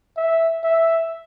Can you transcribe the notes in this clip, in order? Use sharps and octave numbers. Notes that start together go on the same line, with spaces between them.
E5
E5